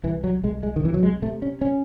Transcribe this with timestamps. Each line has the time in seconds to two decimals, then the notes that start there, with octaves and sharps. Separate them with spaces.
0.03 C2 E3
0.24 F#3
0.43 C2 G#3
0.63 G#3
0.76 D#3
0.83 C3 E3
0.94 F#3
1.03 G#3
1.22 C3 A3
1.42 C#4
1.61 C#4